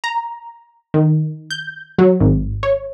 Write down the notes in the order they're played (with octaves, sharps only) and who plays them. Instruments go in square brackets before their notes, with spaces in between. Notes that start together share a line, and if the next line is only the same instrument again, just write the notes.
[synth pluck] A#5
D#3
G6
F#3
G#1
C#5